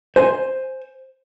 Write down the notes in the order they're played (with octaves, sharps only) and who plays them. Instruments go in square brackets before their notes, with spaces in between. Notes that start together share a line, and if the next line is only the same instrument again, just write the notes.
[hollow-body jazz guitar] C5 G#5